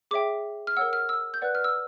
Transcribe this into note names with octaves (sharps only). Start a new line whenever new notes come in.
G#4 C#5 E5 G5 D6
F6
A#4 C#5 F#5 E6
F6
E6
G6
B4 D5 F#5 F#6
F6
E6